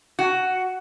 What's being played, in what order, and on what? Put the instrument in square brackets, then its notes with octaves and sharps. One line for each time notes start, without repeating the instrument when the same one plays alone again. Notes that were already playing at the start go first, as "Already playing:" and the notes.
[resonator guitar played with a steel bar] F#4